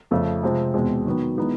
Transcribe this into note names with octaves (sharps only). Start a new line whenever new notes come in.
F2 C#3 F3 A3
C3 F3 G#3 C4
E2 B2 G#3 C4
D#3 F#3 B3
E3 G#3 B3 D#4